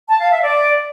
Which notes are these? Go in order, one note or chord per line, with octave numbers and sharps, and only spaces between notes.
A5
F5
E5
D5